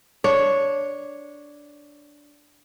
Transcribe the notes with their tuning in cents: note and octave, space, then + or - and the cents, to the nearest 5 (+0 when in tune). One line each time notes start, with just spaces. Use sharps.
D4 -5 C#5 +0